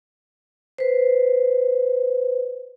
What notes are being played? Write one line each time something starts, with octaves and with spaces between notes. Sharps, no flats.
B4 C5